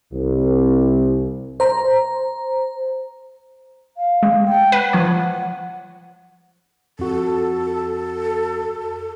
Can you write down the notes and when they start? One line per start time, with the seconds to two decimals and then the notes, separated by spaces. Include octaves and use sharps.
0.12 C2
1.60 C5 A#5
3.96 F5
4.23 G#3
4.46 G5
4.72 B4 F#5
4.93 F3 C#5
6.99 F2 F#4 A4